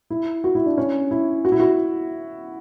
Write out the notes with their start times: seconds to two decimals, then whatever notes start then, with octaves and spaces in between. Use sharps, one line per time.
0.10 E4
0.44 F#4
0.55 E4
0.66 D4
0.78 C#4
1.11 E4
1.45 F#4
1.52 E4
1.60 F#4